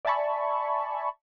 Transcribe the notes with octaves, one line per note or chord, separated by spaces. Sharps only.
D5 E5 G#5 A5 B5 C#6